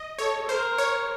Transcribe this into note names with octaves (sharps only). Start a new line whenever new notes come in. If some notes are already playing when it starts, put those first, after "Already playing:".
Already playing: D#5
A4 C#5
A#4 C5
C#5